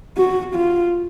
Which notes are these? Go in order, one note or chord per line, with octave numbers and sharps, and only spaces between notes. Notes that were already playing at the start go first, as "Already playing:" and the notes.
F#4
F4